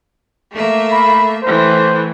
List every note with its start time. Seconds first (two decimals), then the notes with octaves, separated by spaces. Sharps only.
0.52 A3 A#3 E5
0.92 B5
1.43 A2 E3 C5